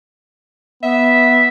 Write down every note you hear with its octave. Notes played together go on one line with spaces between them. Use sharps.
B3 E5